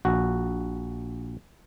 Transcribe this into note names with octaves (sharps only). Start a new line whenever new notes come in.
A#1 F#4